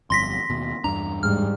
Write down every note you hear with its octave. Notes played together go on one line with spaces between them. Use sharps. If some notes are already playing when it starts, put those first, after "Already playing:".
G1 F2 C6 A#6 B6
D#2 B2
E2 G2 D4 A#5
G#2 G3 F6